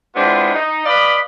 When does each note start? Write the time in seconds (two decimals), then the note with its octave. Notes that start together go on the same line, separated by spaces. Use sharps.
0.15 G#3 B3 C4 D4 E4 F4
0.53 D#4
0.86 B4 D5 D#5 F5 B5